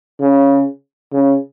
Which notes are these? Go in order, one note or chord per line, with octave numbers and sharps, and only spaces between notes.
C#3
C#3